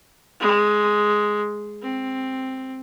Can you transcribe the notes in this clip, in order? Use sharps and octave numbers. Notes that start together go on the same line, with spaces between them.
G#3
C4